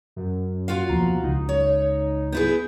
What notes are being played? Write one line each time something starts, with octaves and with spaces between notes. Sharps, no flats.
F#2
F4 F#4 F5
D#2 B2 F3 A#5
C#2 D#4
C#5
B3 E4 G#4 G6